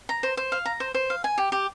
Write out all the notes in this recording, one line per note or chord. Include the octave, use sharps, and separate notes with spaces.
A#5
C5
C5
F5
A#5
C5
C5
F5
G#5
G4
G4